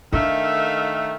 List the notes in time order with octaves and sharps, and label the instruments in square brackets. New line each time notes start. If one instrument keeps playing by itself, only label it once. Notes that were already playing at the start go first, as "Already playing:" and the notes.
[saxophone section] D#3 A3 [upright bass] D4 [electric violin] E5 F5